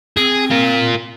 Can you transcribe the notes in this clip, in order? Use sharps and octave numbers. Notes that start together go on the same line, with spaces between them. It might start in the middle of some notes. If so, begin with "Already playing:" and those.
C4 G#4
F4 A#4